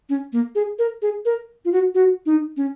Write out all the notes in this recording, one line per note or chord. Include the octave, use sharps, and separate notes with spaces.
C#4
A#3
G#4
A#4
G#4
A#4
F4
F#4
F#4
D#4
C#4